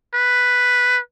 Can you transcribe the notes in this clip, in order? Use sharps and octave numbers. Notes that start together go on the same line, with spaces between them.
B4